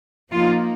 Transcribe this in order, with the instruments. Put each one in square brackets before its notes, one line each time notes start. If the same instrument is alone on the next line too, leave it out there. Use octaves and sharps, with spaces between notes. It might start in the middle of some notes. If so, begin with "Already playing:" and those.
[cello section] F3 A#3 D#4 F4